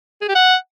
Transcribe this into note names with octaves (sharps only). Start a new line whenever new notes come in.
G#4
G4
F#5